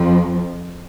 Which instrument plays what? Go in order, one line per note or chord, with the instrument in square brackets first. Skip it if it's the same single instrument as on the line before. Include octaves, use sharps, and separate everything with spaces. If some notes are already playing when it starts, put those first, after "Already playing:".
Already playing: [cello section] F2 F3